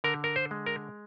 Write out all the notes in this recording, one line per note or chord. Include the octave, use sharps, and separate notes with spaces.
D3 A#4
A#4
C5
G#3
A#4